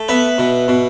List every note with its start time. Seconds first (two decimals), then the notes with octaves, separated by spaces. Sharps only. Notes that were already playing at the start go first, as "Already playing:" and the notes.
Already playing: A3
0.08 B3 B4 E5
0.38 B2
0.68 B2